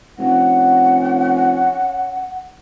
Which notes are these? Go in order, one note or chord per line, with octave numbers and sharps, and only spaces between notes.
F1 C#4 F#5